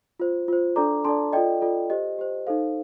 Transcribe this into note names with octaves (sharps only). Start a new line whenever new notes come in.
F4 C5
F4 C5
D4 A4 D5 A#5 D6
D4 A4 D5 A5 C6
F4 A4 D5 D#5 G5
F4 A4 D5
G4 C5 D#5
G4 C5
D#4 A4 C5 F5